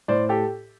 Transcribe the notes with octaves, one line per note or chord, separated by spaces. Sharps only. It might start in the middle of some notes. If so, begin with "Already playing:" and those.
A2 C5 D5
G4 A4